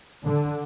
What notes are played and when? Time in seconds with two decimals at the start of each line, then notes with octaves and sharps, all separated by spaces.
0.24 D3